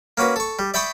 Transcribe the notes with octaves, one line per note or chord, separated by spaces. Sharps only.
A#3 C#4 F#4 B4
A4 C#6
G3
D5 E5 G5 B5 C#6 D#6